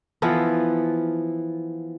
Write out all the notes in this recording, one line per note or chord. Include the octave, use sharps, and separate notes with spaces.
E3 F3 B3 F4